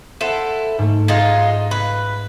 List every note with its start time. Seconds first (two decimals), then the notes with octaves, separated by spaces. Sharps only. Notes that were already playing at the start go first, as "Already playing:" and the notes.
0.21 E4 A4 C5 F#5
0.79 G#2 A3
1.08 G#3 D#4 F4
1.71 B4